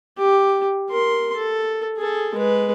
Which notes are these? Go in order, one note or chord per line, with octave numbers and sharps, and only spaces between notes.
G4
A#4 C6
A4
G#4 A4
G#3 B4